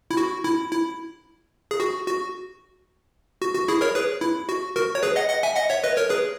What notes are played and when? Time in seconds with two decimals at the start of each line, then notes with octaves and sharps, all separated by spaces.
0.11 E4
0.17 F#4
0.44 E4
0.71 E4
1.71 G#4
1.80 F#4
2.07 F#4
3.41 F#4
3.55 F#4
3.68 E4 G#4
3.81 A#4 C#5
3.95 G#4 B4
4.21 E4
4.49 F#4
4.76 F#4 A#4
4.95 C#5
5.03 G#4 B4
5.16 D#5 F#5
5.30 D#5 F#5
5.43 E5 G#5
5.56 D#5 F#5
5.70 C#5 E5
5.84 B4 D#5
5.96 A#4 C#5
6.10 G#4 B4